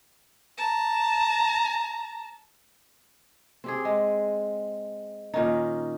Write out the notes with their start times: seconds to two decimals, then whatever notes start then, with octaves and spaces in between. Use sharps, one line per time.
0.58 A5 A#5
3.64 C4 G4 G#4
3.85 G#3
5.34 A#2 D#3 C#4 D#4